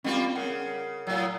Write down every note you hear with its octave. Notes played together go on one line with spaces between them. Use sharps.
G3 A#3 C4 C#4 F4
C#3 A#4 F#5
A2 F#3